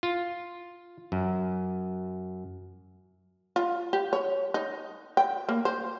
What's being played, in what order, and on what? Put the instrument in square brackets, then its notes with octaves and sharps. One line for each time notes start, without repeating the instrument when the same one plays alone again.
[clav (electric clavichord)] F4
F#2
[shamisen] F4
G4
C#5
D#4
G5
A#3
C5